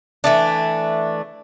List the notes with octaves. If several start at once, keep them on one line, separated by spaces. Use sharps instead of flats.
E3 A3 D4